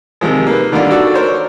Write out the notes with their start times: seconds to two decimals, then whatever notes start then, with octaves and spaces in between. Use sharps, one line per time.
0.21 C3 D#3 F3 G#3
0.47 A#3 B4
0.72 D3 D#3 G3 A#3 D4 F4
0.91 F#4 A4 D5
1.14 A#4 C5 C#5